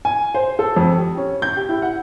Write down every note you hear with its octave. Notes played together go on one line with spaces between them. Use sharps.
G#5
C5
A4
F2
G4
C#4
G6
G4
E4
F#5